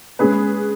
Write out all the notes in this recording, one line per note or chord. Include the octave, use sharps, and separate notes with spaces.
G#3 C#4 G#4 B4